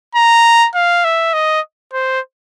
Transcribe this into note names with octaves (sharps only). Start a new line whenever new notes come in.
A#5
F5
E5
D#5
C5